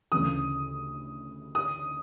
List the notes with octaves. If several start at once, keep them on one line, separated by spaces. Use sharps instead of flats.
D2 C#3 E3 D#6
D#6